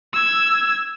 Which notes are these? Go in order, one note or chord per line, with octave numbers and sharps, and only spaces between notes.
E6 G#6